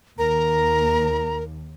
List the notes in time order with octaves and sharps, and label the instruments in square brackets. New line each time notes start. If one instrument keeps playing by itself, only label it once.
[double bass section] D#2 [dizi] A#4 [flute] A#5